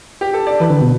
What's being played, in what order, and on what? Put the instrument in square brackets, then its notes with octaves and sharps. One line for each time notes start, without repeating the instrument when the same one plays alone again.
[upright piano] G4
A4
D5
[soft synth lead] E3 [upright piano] B4
[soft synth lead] D3
B2